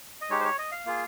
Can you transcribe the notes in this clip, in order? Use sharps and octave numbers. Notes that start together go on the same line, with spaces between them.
D#5
G#3 D#4 G4 C#5
C5
C#5
D#5
F5
A#3 F4 G#4